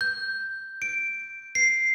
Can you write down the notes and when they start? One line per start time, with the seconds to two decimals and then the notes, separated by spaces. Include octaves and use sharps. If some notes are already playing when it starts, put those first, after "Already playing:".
0.01 G6
0.82 D7
1.55 C7